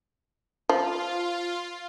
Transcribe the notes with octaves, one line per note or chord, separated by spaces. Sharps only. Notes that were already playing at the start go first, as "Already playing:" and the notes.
F3 F4